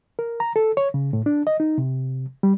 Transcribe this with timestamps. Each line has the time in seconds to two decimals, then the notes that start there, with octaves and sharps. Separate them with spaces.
0.19 A#4
0.40 A#5
0.56 A4
0.77 C#5
0.94 C#3
1.13 A2
1.26 D4
1.47 D#5
1.60 D#4
1.78 C3
2.43 G3